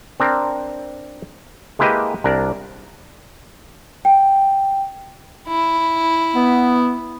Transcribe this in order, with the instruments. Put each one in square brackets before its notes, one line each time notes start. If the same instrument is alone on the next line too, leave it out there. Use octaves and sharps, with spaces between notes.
[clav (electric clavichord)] C4 D4 A#4
G#3 A#3 E4 G4 B4 D#5
C2 D4 A#4 D5
[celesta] G5
[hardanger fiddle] E4
[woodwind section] B3